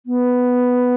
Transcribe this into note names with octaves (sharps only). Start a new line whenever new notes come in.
B3